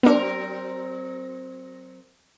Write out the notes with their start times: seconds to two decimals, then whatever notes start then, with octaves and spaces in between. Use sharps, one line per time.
0.03 F#3 B3 C4 D4 A#4